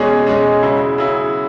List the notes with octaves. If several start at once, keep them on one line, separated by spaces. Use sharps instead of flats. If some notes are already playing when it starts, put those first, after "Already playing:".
Already playing: E2 B2 G#3 C#4 G#4
E2 B2 G#3 C#4 G#4
C#3 F#3 E4
C#3 F#3 E4